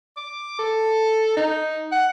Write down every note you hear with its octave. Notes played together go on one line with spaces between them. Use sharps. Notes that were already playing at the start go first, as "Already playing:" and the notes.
D6
A4
D#4
F#5